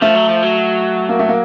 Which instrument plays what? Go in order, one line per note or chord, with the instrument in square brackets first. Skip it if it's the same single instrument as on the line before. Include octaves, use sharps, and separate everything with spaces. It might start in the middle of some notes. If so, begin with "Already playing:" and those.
[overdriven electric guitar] F3 [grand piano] A3
[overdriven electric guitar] F#3
F3
F#3
[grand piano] A#3
A3
A#3